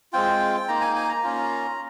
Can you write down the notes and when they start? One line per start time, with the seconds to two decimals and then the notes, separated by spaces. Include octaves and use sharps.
0.13 G#3 C4 F4 G5
0.68 A#3 D#4 A#5
0.81 G#5
0.96 G#5
1.09 A#5
1.23 A#3 C#4 F4